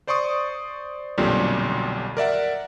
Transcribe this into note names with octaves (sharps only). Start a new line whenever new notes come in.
C5 D5 C6 C#6 D#6
B1 F2 A#2 D3 G3
A#4 D5 E5 F#5